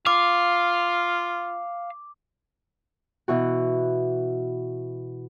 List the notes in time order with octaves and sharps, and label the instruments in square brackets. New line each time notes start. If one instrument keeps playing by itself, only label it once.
[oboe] F4 [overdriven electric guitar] F5 [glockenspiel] D6
[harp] B2 E3 F#4